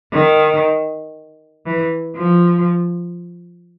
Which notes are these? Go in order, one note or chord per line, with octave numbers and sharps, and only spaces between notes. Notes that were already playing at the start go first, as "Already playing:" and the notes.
D#3
E3
F3